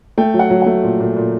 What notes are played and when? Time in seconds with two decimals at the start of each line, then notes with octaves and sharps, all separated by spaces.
0.18 A3 G5
0.34 F#3
0.39 F#5
0.50 F#3
0.62 A3 F#5
0.83 A#2
1.00 A#2
1.16 A#2